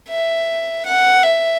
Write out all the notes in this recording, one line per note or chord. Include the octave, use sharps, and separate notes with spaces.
E5
F#5
E5